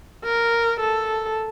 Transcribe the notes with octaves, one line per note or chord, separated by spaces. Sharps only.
A#4
A4